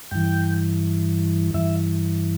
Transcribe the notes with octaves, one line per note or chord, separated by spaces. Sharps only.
G2 E3 G5
G2 E3 E5